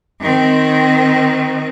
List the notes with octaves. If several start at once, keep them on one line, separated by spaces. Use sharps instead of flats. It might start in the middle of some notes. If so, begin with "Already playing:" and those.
D#3 C4